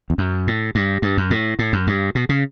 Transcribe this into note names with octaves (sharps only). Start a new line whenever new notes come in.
E2
F#2
A2
G2
G2
F#2
A2
A2
F#2
G2
B2
C#3